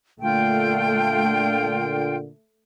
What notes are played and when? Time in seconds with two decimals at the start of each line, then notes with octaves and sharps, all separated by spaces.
0.21 A#2 D3 A3 F4 G5